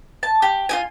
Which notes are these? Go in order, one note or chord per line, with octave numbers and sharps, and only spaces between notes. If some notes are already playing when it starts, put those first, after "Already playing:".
A5
G4
F4 G4 G#5